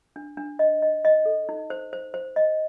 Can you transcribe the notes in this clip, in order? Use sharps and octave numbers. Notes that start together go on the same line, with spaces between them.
D4
D4
D#5
D#5
D#5
A4
D#4
C5
C5
C5
D#5